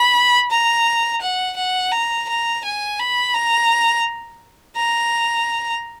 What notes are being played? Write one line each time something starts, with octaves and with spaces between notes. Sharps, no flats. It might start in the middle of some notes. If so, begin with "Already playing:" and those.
Already playing: B5
A#5
F#5
F#5
A#5
A#5
G#5
B5
A#5
A#5